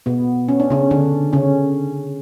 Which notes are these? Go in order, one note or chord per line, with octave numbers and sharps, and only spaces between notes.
B2 B3
C#4
D4
C#3 C#4
D3 D4
C#3 C#4